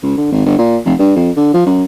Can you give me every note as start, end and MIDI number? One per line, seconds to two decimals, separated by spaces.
0.03 0.15 37
0.17 0.32 50
0.32 0.42 32
0.46 0.54 31
0.59 0.78 46
0.86 0.94 29
0.99 1.14 43
1.17 1.31 41
1.37 1.52 50
1.54 1.66 53
1.67 1.83 42